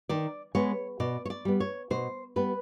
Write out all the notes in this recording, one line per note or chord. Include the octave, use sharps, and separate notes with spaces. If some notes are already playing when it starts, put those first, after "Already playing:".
D#3 D5
G#3 B3 C#5
B2 D5
C#5
D5
G3 B3
C#5
B2 C5
G3 B3 B4